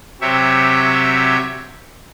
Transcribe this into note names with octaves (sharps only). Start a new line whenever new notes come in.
C3 F#3 G4 C#5 E5